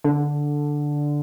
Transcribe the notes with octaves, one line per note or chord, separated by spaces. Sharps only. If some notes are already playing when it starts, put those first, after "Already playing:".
D3